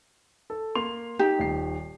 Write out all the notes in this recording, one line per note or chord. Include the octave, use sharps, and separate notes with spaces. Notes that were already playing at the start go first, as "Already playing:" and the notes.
A4
A#3 C6 F7
D#4 G4
D#1 C7